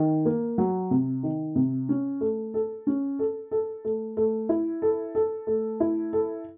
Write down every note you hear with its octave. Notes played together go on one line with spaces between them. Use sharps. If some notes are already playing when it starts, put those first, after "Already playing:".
Already playing: D#3
A#3
F#3
C3
D#3
C3
C#4
A3
A4
C#4
A4
A4
A3
A3
E4
A4
A4
A3
E4
A4